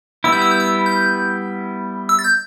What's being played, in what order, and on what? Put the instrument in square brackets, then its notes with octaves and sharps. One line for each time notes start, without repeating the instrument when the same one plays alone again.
[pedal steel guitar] G3 B3 E4 [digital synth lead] E6
[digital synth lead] G6
E6
G6
E6
G6
E6
A6
G6